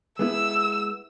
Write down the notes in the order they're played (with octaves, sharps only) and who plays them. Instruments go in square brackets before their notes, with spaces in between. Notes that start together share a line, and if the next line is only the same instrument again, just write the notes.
[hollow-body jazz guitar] G#3 B3 E4 [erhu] E6